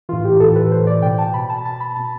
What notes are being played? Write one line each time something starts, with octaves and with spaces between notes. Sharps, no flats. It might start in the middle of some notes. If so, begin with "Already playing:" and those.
A2 E3 F4
G4
A2 E3 A4
B4
A2 E3 C5
D5
B2 G5
A5
B2 B5
A5
B2 A5
B5
B2 A5